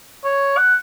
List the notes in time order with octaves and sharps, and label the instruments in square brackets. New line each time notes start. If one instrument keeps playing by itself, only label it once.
[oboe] C#5
F#5